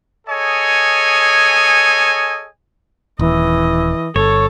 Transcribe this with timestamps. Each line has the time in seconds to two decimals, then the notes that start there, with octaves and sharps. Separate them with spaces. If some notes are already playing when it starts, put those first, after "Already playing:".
0.27 G#4 A4 C#5 D#5 G#5
3.19 D#1 E3 D#5
4.16 G1 A4 C#5